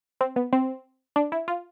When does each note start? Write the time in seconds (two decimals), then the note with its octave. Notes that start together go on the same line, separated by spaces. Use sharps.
0.21 C4
0.36 B3
0.53 C4
1.16 D4
1.32 E4
1.48 F4